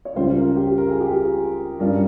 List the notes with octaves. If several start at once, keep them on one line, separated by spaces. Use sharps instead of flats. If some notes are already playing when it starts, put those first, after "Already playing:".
C#5
C#2 C#3 G3 C#4 F4 C5
A#4
G4
A#4
G#4
G4
G#4
G2 G3 C#4 F4 A#4